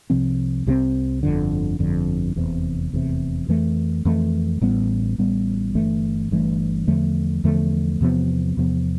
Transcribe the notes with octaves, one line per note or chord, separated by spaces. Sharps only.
C2 C3 F3 C4
C2 C3 F3 C4
G1 F2 D3
G1 F2 D3
F1 E2 C3
F1 E2 C3
F2 E3 A3
F2 E3 A3
A1 A2 G3 B3
A1 A2 G3 B3
G1 G2 E3 A3
G1 G2 E3 A3
E2 D3 F3 A3
E2 D3 F3 A3
E2 C3 F3 B3
E2 C3 F3 B3